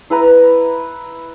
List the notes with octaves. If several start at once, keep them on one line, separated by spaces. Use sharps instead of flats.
E4 B4 A#5